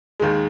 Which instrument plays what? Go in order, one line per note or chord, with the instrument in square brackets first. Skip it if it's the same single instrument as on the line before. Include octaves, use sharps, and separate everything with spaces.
[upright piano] D#2 D#3 G#3